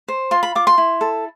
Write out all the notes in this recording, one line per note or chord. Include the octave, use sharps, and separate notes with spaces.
C5
F4 C6
B5
F4 D6
C6
E4
A4